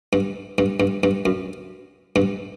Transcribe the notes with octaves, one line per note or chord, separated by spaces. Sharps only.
G2
G2
G2
G2
F#2
G2